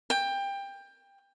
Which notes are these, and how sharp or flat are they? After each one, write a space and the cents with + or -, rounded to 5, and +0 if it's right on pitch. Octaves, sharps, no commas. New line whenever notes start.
G5 +20